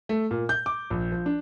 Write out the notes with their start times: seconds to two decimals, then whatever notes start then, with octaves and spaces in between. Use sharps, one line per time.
0.09 A3
0.31 A#2
0.49 G6
0.66 D6
0.90 A#1
1.12 F3
1.26 D4